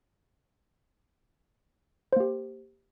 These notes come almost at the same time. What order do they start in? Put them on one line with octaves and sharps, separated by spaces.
C5 A#3 G4